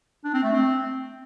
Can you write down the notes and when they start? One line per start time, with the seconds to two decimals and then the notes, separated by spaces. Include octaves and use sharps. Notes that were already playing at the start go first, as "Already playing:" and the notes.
0.24 D4
0.34 C4
0.43 A3
0.53 C4